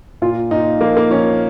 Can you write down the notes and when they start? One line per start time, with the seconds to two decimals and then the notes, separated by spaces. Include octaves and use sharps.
0.22 A#2 F4
0.51 A#2 D#4
0.81 F3 A#3
0.97 A#3
1.10 F3 C#4